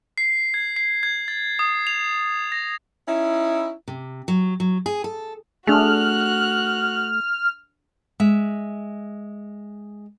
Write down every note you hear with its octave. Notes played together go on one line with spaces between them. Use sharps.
C7
G#6
C7
G#6
A6
D#6
F7
A#6
C#4 D#4 E4
C3
F#3
F#3
G#4
A4
A3 D4 F#4 G#4 F6 F#6
G#3 E5